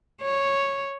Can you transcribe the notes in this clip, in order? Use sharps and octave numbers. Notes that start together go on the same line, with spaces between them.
C#5